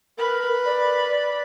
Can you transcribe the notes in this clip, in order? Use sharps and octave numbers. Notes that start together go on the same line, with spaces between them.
A#4 B4 B5
D5